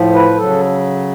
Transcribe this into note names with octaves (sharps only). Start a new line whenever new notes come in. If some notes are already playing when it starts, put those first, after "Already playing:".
Already playing: A2 F3
B4
C#3 F#3 A4